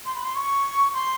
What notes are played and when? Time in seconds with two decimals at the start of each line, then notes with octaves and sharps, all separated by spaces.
0.05 C6
0.15 B5
0.24 C6
0.35 C#6
0.94 C6